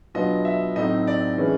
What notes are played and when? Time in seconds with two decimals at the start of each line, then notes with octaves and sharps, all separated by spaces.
0.14 B2 F#3 B3 D4 F4 D#5
0.45 E5
0.76 A2 F#3 A3 C4 D#4 D#5
1.07 D5
1.38 E3 G#3 C#4